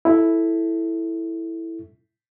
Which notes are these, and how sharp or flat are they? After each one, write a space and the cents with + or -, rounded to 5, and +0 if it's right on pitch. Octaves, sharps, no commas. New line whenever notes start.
E4 +0 A4 +0